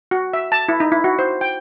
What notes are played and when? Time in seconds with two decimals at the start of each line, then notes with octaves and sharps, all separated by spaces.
0.11 F#4
0.33 E5
0.52 A5
0.68 E4
0.80 D#4
0.92 E4
1.04 F#4
1.19 C5
1.41 G5